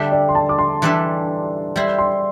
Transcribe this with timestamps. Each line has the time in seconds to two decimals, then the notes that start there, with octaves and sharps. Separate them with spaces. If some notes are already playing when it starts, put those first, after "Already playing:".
Already playing: D3 G3 D4 G4 E5
0.12 D5
0.29 C6
0.35 A5
0.49 D6
0.59 C6
0.82 E3 G3 D4 A4 E5
1.76 G3 E4 C5
1.98 C6